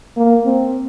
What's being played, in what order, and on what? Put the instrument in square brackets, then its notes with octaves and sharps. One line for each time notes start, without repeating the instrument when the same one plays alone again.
[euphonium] A#3
C4